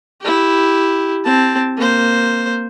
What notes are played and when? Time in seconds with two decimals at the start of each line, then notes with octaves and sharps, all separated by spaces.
0.21 E4 G4
1.25 C4 A5
1.77 A#3 C5